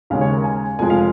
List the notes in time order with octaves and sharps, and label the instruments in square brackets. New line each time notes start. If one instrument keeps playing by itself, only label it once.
[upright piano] D#2 C#3 G#3 C#4 F5
C#5
A#4
G#5
F1 F2 F3 G#3 G#5
F5